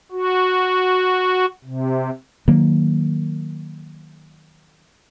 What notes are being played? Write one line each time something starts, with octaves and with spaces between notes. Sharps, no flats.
F#4
C3
D#3 F#3 A#3